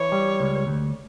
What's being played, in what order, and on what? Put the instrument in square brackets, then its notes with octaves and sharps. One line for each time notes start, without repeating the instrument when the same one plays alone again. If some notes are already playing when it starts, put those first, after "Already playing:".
Already playing: [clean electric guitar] E3 [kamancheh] C#5
[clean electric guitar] G3
C#2
D2